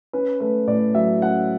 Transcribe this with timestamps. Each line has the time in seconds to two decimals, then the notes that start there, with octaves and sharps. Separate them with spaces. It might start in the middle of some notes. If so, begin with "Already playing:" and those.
0.13 C#4 B4
0.40 A3 B4
0.67 A2 D5
0.95 F#3 E5
1.22 C#4 F#5